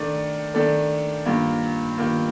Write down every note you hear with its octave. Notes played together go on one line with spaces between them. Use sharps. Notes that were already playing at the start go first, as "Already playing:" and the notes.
Already playing: D#3 A3 D4 A4 D5
D#3 A3 D4 A4 D5
G2 D#3 A#3 F4
G2 D#3 A#3 F4